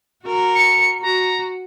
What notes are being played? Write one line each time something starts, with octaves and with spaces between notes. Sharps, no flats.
F#4 A#4
C#7
F#4 A#5